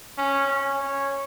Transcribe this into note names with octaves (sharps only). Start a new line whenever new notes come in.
C#4
C#4
C#5